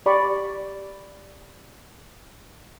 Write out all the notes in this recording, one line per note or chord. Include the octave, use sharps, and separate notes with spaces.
G4 D5 B5 C#6